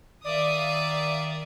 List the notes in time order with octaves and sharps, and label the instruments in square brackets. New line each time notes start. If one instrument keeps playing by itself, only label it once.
[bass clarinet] D#3 [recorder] D5 [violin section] E5 F5 D#6